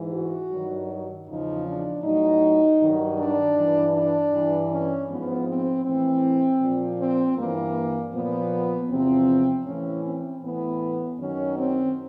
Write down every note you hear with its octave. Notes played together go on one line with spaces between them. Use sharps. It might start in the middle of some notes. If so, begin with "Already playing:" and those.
Already playing: G#2 E3
F#4
G2 D#3 F#3
E2 C#3 F3 D#4
D4
A2 F#3 D#4
G2 D#3 F#3
D4
G2 E3
D4
G2 E3
C#4
G#2 F3 B3
C4
A2 E3 C4
A#2 F3
C4
G2 E3 A#3
A#2 F3 B3
E2 C3 F3 C4
A2 E3 C#4
C4
A2 E3 B3
F#2 D#3 F#3 C#4
C4